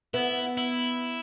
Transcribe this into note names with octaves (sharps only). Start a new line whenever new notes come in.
B3 E4
E4